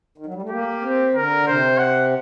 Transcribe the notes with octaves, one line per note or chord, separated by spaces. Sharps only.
D#3
F#3
G3
A3
A#3 G4
C4
D3 A#4
A#2
C3 C5
F#5